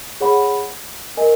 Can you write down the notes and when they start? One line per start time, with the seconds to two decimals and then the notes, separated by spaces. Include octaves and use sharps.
0.21 G#4 C#5 F#5 B5
1.17 A#4 D#5 G#5